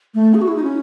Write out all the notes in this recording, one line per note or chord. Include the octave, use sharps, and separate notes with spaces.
A3
G#4
F#4
E4
D#4
C#4